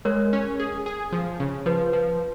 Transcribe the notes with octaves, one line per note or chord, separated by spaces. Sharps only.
G#3 A#4 C#5
C#4
G#4
G#4
F3
C#3
F3 B4
F3